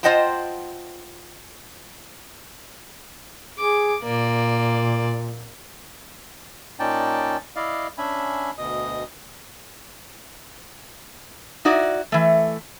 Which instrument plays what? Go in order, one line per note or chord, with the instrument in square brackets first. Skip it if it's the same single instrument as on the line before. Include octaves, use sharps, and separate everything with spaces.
[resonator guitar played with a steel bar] F4 C5 D#5 F#5 G5 A5
[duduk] G#4 [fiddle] D6
[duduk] A#2 [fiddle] A#3 D5
[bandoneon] A#2 C#4 D#4 D5 G5 A5
E4 D5 D#5 F5
C#4 D4 E5 G#5 B5
D2 B2 D#5 D#6
[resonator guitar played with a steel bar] D#4 E4 F#4 D5
E3 A3